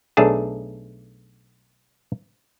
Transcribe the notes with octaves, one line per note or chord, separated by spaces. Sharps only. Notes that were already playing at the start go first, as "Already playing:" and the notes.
B1 A3 D4 G#4 A5